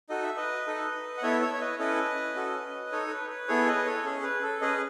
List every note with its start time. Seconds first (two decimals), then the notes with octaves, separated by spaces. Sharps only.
0.09 D#4 F#4 A4 D#5
0.23 E5
0.37 B4 D#5
0.67 D#4 A4
1.18 F#5
1.22 B3 E4 A4 C#5 E5
1.42 C#5 E5
1.54 C#5
1.61 B4 D#5
1.79 C#4 E4 A4 B4 D#5
2.35 C#4 F#4 A4
2.92 D#4 A4 C#5
3.07 A4
3.11 B4
3.30 B4
3.48 B3 E4 G#4 A4 C#5
3.67 B4 D#5
3.86 A4 C#5
4.05 C#4 G#4
4.23 B4
4.43 A4
4.61 C#4 G#4 B4 D#5